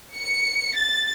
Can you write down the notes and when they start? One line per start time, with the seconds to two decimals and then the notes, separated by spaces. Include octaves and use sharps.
0.14 C#7
0.76 A6